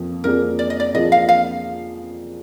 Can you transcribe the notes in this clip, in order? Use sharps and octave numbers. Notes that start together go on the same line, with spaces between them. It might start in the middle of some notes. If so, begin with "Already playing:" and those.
Already playing: F2 F3 A#3
F2 F3 A#3 D4 G#4 A#4
D5
D#5
D5
F2 F3 A#3 D4 G#4 D#5
F5
F5